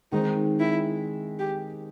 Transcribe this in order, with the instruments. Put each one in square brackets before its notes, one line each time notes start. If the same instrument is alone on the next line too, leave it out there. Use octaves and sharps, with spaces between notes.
[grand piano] D#3 G#3 C4 [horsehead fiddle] D#4
[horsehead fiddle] E4
G4